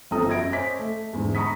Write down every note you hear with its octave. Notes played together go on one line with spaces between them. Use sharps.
G1 C4 F4 A4 A#5 D#6
F#2 E5 G#6 A#6 D7
C5 C#5 D#5 G#5 D6 B6
A3
E2 G#2 D3
A#5 B5 C#6 D#6 B6